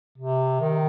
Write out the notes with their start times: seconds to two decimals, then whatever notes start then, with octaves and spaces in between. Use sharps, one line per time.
0.18 C3
0.61 D#3